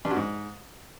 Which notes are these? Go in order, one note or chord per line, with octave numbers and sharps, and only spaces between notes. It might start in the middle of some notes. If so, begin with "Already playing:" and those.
G2
F#2
G#2